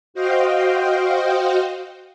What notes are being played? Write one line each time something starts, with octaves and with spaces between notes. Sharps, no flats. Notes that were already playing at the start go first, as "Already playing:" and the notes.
F#4 C5 D#5 F5 G5